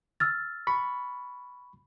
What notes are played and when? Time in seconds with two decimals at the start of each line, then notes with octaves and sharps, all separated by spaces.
0.20 E6 F6 A6
0.67 B5 C#6